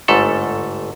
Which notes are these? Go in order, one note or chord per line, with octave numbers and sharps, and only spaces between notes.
G1 G#2 A3 A4